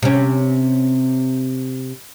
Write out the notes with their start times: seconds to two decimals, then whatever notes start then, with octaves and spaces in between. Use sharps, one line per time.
0.03 C3 C#4